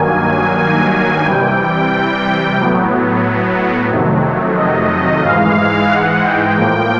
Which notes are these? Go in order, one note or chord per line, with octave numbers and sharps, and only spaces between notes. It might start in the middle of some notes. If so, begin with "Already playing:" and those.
Already playing: G2 D#3 F#3 A#3 G#5
G#5
G#5
C3 E3 G3 G5
A2 F#3 B3
F2 C3 D#3 F#3 A3
D#5
G#2 E3 G#3 F5
F#5
G5
A2 F3 A#3